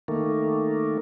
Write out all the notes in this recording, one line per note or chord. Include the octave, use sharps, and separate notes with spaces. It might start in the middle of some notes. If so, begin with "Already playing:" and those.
D#3 A3 A#3